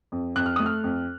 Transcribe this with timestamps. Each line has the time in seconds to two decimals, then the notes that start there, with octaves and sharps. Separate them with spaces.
0.12 F2
0.36 F2 F#6
0.46 F6
0.56 A3 D#6
0.66 F6
0.84 F2